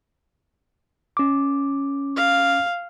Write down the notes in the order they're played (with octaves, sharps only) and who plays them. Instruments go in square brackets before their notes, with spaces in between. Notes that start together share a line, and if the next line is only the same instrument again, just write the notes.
[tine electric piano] C#4 D6
[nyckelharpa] F5